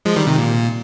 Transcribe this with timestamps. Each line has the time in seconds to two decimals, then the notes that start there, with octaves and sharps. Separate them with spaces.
0.05 F3 G#3
0.16 D#3 G3
0.27 C3 D#3
0.38 A#2